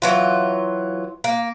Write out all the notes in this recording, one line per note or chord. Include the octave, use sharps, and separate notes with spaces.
E3 F#3 F4
A#3